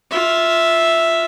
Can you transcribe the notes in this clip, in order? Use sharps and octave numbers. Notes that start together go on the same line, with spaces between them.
F4 E5